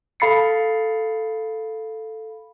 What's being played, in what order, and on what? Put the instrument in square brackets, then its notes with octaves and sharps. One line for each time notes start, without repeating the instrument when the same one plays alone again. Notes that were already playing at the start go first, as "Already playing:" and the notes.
[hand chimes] A4 F5 B5 A6 C7 C#7